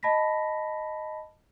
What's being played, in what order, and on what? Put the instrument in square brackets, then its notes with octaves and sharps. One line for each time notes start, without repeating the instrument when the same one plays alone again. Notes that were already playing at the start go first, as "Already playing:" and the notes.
[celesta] D#5 A5 B5 A#6 B6